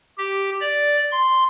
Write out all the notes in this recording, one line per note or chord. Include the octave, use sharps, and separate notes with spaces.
G4
D5
C6